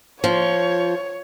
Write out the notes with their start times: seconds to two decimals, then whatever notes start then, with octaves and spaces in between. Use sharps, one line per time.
0.24 F3 C#5